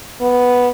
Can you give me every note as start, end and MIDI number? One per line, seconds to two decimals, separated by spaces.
0.21 0.69 59